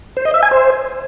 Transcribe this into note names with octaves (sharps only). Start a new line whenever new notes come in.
C5
D#5
E5
G#5
C5